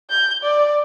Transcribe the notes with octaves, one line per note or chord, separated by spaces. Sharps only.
G6
D5